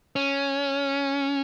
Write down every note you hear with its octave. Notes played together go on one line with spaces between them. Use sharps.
C#4